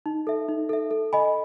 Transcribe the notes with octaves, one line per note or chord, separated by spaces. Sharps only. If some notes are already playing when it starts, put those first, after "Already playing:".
D#4
A4 E5
D#4
A4 E5
A4
D#5 G#5 B5